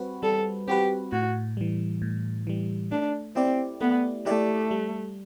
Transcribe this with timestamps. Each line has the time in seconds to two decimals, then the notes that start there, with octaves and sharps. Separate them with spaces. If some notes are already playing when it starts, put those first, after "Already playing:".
Already playing: G3 C4 F#4 B4
0.23 G3 A4
0.68 C4 F#4 G4 B4
1.12 A2 F#4
1.57 E3 G3
2.02 A2
2.47 E3 G3
2.92 A3 D4
3.36 C4 E4 G4 D5
3.80 A3 B3
4.26 A3 E4 G4 D5
4.71 G3